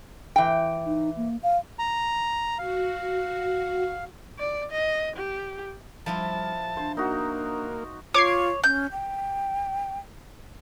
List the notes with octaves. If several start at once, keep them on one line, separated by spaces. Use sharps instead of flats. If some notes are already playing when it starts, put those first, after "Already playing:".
E3 G5
D#4
A#3
F5
A#5
F#4 F5
D5
D#5
G4
F3 G3 E4 F4 A5 B5
D4 C5
A#3 D#4 F#4
F4 C#5 D6 G#6 C7
C#4 G6
G5